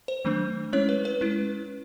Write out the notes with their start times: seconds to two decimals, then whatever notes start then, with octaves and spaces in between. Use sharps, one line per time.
0.08 C5
0.25 D#3 F#3 A3 D4
0.73 G#3 C#4 E4 C#5
0.89 B4
1.05 B4
1.21 G#3 C#4 E4